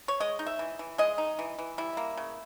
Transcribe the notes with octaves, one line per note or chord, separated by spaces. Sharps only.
C#5
G#3 D#5
D#4
E5
E3
E3
G#3 D#5
D#4
E3
E3
G3 E4
A#3
C#3